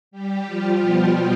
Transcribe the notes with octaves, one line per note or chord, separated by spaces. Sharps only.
G3 G4
F3 F4
B2 B3